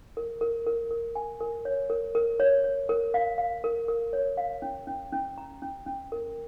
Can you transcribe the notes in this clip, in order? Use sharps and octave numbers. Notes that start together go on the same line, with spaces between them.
A#4
A#4
A#4
A#4
G#5
A#4
C#5
A#4
A#4
C#5
C#5
A#4
F5
F5
A#4
A#4
C#5
F5
C#4
C#4
C#4
A#5
C#4
C#4
A#4